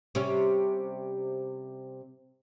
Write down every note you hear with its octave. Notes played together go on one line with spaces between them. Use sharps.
C3 G3 C#4